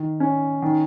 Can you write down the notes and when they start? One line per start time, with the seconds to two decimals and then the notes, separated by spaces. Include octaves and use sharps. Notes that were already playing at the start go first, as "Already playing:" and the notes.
Already playing: D#3
0.20 C#4
0.62 D#3